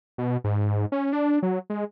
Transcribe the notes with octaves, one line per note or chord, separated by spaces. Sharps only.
B2
G#2
C#4
D4
F#3
G#3